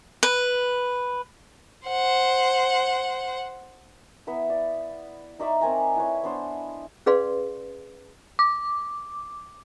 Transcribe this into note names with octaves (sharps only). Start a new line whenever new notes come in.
B4
C5 F#5
B3 E4 B4 E6
D5
D#4 D5 E5 C#6
C4 A#4 G#5 A#5
E4 B4 C#5
B3 D4 C5
C#4 G#4 B4 D5 F5 C6
D6